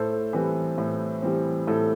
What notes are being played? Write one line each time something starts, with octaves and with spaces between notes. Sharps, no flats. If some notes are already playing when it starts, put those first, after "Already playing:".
Already playing: A2 A4 C5
E3 G3 C4 B4
A2
E3 G3 C4
A2 A4